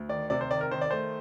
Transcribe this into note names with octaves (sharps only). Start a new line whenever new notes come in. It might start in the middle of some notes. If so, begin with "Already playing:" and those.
Already playing: D2
D#3 D5
C3 D5
C5
D#3 D5
A#4
D#3 C5
D5
A3 C5